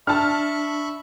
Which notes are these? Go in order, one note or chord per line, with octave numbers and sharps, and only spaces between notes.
D4 E5 A5 B5 C#6 F6